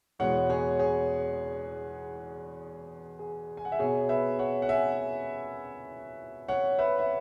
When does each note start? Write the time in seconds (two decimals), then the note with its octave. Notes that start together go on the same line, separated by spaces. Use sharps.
0.19 E2 B2 G#3 B3 C#5 F#5
0.50 G#4 C#5
0.79 G#4 C#5
3.19 G#4
3.57 G#5
3.65 F#5
3.72 E5
3.79 B2 B3 G#4 C#5
4.09 B4 E5
4.39 C#5 F#5
4.62 F#5
4.69 E5 G#5
6.48 C#5 F#5
6.79 B4 E5
6.99 E5